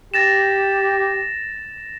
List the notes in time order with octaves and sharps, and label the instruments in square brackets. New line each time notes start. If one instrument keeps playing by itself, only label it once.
[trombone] G4 [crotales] A6 A#6 E7